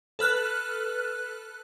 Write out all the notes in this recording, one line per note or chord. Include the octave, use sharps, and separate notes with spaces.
A4 B4 F6 F#6